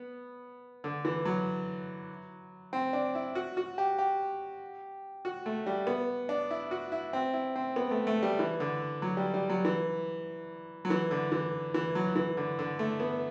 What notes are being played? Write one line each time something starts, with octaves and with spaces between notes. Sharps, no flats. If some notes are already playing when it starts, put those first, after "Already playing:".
Already playing: B3
D3
E3
F#3
C4
D4
E4
F#4
F#4
G4
G4
F#4
A3
G3
B3
D4
E4
F#4
E4
C4
E4
C4
B3
A3
A3
G3
E3
D3
F#3
G3
G3
F#3
E3
F#3
E3
D3
E3
E3
F#3
E3
D3
D3
A3
B3